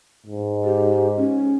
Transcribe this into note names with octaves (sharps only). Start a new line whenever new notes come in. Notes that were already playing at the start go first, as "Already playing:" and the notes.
G#2
G4
C#4